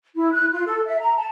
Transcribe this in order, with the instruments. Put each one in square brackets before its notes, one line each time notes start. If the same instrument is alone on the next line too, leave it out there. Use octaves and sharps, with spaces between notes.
[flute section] E4
F#6
F4
A4
E5
A#5
A5